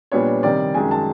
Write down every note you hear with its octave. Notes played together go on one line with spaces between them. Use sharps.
A#2 G3 B3 D4 C#5
C3 D#3 G3 D5
F#2 D#3 G#3 G#5
A5